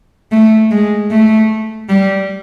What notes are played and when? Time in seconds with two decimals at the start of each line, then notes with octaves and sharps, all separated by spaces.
0.32 A3
0.71 G#3
1.10 A3
1.89 G3